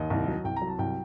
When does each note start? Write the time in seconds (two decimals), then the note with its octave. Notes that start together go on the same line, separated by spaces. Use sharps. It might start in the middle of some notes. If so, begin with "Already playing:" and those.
Already playing: D#2 D#5
0.10 C2
0.28 F#3
0.44 C2 G5
0.57 A#5
0.62 F#3
0.68 A5
0.79 C2 G5